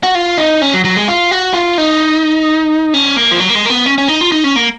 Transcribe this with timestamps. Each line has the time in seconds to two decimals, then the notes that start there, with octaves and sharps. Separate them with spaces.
0.03 F#4
0.15 F4
0.38 D#4
0.62 C#4
0.74 F#3
0.85 F#3
0.97 G#3
1.08 F4
1.31 F#4
1.54 F4
1.78 D#4
2.94 C#4
3.17 A#3
3.31 F3
3.40 F#3
3.49 A#3
3.55 G#3
3.65 A#3
3.70 B3
3.86 C#4
3.98 C#4
4.08 D#4
4.21 F4
4.32 D#4
4.44 C#4
4.56 A#3